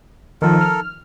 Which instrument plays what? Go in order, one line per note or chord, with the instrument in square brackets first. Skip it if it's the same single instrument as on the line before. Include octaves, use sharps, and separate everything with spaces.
[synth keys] D#3 F3 [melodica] A4 A#4
[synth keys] F6